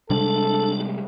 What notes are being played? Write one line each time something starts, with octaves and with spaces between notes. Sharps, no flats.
C3 G3 G#3 D4 A4